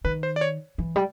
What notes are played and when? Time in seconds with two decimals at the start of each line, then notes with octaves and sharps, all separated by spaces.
0.04 D#3 B4
0.23 C5
0.36 D5
0.41 C#5
0.78 E3
0.96 G3